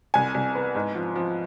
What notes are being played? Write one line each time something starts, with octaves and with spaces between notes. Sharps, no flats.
C2 G#5
C2
B3
G#2
F3
F3